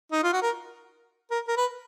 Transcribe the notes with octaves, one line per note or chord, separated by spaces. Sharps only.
D#4
F4
F#4
A#4
A#4
A#4
B4